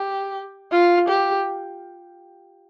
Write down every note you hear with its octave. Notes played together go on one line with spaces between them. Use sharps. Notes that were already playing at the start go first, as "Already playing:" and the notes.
Already playing: G4
F4
G4